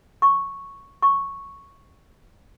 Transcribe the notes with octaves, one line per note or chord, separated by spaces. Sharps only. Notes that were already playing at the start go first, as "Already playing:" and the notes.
C#6
C#6